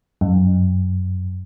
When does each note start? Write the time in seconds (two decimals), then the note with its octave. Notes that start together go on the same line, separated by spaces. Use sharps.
0.21 F#2